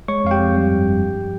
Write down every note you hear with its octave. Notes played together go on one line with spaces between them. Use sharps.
G#3 C#5 C#6
F2 F5
G4 G5
F2
G3
G2
G2
F3